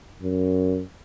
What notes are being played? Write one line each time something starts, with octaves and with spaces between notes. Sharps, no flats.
F#2